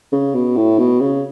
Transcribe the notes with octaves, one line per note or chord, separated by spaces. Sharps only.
C#3
B2
A2
B2
C#3